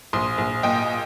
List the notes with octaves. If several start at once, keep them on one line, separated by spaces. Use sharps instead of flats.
A#1 C6 D#6
A#1
A#2 D#5 G5